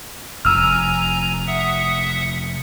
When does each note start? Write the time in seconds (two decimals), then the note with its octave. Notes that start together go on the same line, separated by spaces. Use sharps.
0.45 F1 F2 G#5 A#5 E6 F6
1.47 E5 F#5 D#6